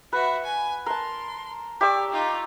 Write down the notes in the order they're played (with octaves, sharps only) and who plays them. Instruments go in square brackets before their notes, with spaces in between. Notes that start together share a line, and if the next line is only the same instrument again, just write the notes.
[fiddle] F#4 E5 [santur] B4
[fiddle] G#5
[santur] A#4 A5 [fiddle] C6
[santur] G4 C#6 E6 [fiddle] D5
[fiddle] D#4 F4